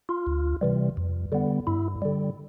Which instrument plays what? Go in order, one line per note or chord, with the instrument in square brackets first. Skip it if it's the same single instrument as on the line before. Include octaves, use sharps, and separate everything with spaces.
[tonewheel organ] F4
D2
C3 E3 G3
F2
D3 G3 B3
G2 E4
D3 G3